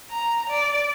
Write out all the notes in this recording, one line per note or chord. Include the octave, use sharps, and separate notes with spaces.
A#5
D5